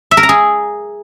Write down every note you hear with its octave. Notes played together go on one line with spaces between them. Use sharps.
E5
A#4
A#5
G#4